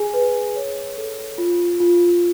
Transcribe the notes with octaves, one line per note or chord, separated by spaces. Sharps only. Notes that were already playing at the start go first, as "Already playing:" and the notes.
Already playing: G#4 G#5
B4
C#5
A4
F4
F4